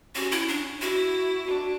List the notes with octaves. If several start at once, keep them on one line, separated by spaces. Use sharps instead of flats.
C#4 F#4
E4
D4
E4 F#4
D4